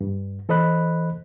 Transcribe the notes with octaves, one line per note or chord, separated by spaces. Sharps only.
G2
E3 A4 C5 D#5 B5 F#6